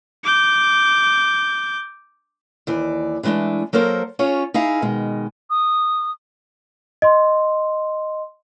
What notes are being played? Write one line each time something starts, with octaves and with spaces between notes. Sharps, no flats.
D6 G6
D#2 E3 D5
D3 E3 G#3 A3 D4
F#3 A#3 A4 A#4 C5
C#4 F4 G#4 C#5
D#4 E4 G#4 F5
B2 D#3 G#3
D#6
D#5 C6